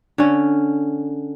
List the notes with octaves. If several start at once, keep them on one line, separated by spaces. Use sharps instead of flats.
D3 C#4